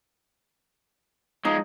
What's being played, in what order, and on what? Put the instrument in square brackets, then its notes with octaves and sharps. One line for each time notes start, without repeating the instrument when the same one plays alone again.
[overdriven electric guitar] F3 G#3 [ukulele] D#4